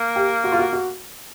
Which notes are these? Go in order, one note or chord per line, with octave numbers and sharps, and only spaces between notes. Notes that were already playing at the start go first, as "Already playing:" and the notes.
Already playing: A#3
G4
F#4
F4
F#4
F#4